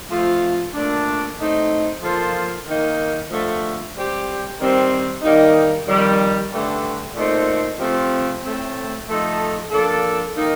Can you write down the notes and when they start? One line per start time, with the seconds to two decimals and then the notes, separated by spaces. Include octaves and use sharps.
0.10 F3 A3 C4 F4
0.74 A#2 A3 D4
1.38 A2 A3 C4 D#4
2.01 F3 A#3 F4 A4 C5
2.66 D#3 A#3 D#4
3.30 D3 F3 A3
3.94 G3 C4 G4
4.59 D#3 G3 C4
5.22 D#3 G3 A#3 D#4
5.87 F2 D#3 G3
6.50 G2 D3 A3
7.15 A#2 A3 C4 D#4 A4
7.78 C3 F3 A3 C4
8.43 A2 A3 C4
9.08 F3 A3 D#4 A4
9.71 F3 A#3 D4 A4
10.35 D#3 A#3 D#4